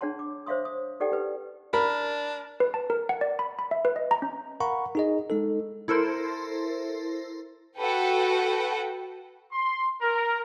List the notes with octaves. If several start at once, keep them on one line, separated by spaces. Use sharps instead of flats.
D4 G#4 C#5 F#5 A5 C6
D6
C5 C#5 E5 F5 C6 D#6
D#6
D#4 G4 A4 D5 F#5 G5
G4 B4
D4 A#4 B5
B4
A5
A#4
F#5
D5
B5
B5
E5
B4
D#5
A#5
C#4
A#4 F5 F#5 A#5 B5 C#6
D#4 G#4 D#5
G#3 D#4 A4
E4 A4 A#4 C5 C6
F#4 A4 B4 F#5 G5
C6
A#4